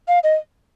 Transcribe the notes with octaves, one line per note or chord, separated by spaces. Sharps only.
F5
D#5